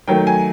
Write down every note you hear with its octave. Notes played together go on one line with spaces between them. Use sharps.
D#3 F#3 A3 G5
G#5